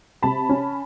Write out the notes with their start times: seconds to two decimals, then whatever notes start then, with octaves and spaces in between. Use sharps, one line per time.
0.23 C3 A5 B5
0.49 C#4